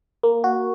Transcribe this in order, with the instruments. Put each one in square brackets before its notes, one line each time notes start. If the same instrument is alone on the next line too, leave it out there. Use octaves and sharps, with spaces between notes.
[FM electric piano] A#3
F#4